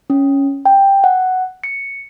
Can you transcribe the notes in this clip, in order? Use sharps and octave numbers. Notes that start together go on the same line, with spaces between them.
C#4
G5
F#5
C#7